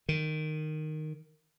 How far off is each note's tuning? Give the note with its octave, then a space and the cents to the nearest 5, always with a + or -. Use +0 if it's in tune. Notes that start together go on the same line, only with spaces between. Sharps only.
D#3 -10